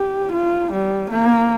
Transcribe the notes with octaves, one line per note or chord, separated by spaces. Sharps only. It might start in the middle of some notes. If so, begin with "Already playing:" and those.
Already playing: G4
F4
G3
A#3